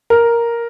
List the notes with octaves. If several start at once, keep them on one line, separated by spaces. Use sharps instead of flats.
A#4